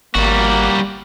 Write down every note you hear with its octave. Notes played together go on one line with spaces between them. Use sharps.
G#1 G3 A#3 F#4